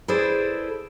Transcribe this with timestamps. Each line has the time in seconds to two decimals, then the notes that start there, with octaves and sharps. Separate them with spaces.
0.08 E4 G#4 A4 B4 C5 D5